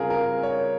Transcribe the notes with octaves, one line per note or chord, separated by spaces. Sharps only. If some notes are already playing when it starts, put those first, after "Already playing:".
Already playing: C#3 G3 C4 F4 G#4 A#4
A#4
C#5